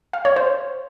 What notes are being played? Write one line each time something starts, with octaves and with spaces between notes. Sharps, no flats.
F5
C#5
C5